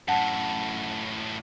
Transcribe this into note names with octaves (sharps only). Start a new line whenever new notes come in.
F#2 A2 F#5 A5